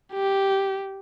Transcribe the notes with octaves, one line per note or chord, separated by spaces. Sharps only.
G4